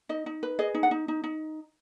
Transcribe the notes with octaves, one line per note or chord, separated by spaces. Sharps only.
D#4 D#5
D#4
B4
G#4 D#5
D#4
F#5
D#4
D#4
D#4